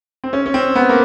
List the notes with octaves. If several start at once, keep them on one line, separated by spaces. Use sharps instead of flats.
C4
C#4
C#4
C4
B3
A#3